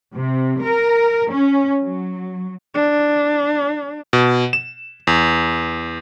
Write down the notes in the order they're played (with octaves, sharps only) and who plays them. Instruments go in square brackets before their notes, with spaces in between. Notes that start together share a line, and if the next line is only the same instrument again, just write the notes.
[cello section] C3
A#4
C#4
F#3
[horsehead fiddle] D4
[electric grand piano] B2
E7
E2